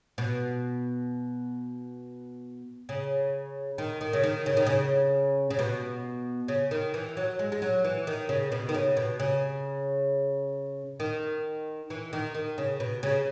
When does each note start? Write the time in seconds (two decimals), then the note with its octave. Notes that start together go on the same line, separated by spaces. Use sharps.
0.18 B2
2.89 C#3
3.78 D#3
4.01 D#3
4.13 C#3
4.23 D#3
4.46 C#3
4.57 D#3
4.66 C#3
5.50 C#3
5.59 B2
6.48 C#3
6.71 D#3
6.94 E3
7.17 F#3
7.39 G#3
7.52 G#3
7.62 F#3
7.84 E3
8.07 D#3
8.29 C#3
8.52 B2
8.69 D#3
8.74 C#3
8.97 B2
9.20 C#3
11.00 D#3
11.90 E3
12.13 D#3
12.35 D#3
12.58 C#3
12.80 B2
13.03 C#3